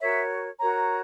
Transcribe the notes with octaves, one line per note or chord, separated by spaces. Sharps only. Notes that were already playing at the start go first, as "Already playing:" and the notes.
F#4 A#4 C#5 E5
F#4 A#4 C#5 A#5